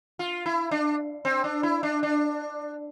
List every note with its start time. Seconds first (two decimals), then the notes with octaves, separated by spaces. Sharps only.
0.19 F4
0.46 E4
0.71 D4
1.25 C4
1.44 D4
1.63 E4
1.83 D4
2.03 D4